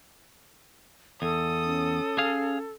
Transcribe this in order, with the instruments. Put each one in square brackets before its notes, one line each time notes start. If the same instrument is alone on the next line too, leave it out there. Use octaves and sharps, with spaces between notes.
[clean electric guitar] E2 [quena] A4 [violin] D#6
[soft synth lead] C#4
[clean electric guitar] G#4 F5